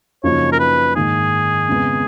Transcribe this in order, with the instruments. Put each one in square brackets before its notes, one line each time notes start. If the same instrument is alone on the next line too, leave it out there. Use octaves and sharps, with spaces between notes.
[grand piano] F#2 C#3 F3 A#3 D#4 [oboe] C#5
[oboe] A#4
B4
[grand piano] G#2 D#3 A#3 D#4 [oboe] G#4
[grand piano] F2 C#3 G#3 B3